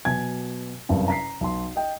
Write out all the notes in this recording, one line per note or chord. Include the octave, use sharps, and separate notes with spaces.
B2 F#3 G#5 G#6
F#1 G2 C3
A#5 B6 C7
B1 C6
D#5 G5